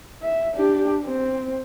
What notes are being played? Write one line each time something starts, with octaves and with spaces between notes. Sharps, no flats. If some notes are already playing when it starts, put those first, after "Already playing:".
E5
D4 G4
C4